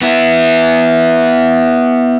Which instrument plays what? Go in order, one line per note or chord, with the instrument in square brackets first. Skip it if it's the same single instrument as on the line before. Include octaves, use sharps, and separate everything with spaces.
[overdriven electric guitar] B3 E4